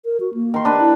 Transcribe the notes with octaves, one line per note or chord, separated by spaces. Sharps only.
A#4
F#4
A#3
D#3 C6
D4 B4
E4